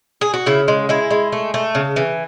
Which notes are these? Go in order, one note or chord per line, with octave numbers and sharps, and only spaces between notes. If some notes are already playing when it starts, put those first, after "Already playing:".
G#4
F#4
C#3 E4
G#3
G#3 E4
G#3
A3
A3
C#3
E3